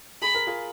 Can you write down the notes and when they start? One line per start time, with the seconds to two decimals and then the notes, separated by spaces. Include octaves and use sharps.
0.22 G#4 B5
0.35 A#4
0.47 F4 G#4